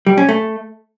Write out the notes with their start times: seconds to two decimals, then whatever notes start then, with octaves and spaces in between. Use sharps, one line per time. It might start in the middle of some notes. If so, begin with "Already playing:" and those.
0.07 G3
0.18 C#4
0.29 A3